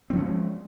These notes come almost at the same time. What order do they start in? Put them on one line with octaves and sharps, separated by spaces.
C4 F3 C#4 G#3